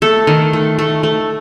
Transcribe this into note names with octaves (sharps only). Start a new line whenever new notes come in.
A3 A4
D#3
A3
A3
A3